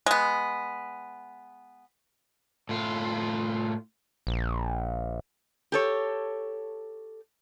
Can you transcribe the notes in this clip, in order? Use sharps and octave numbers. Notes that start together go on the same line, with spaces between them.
G#3 B3
A2 F4
A#1
G4 A4 C#5